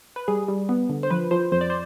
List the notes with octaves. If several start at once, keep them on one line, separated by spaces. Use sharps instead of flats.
B4
G3 G#4
G3
B3
D3
C5
F3 B4
F3 C5
F2 C5
D5
C5